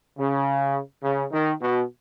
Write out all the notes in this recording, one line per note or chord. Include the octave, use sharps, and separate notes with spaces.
C#3
C#3
D#3
B2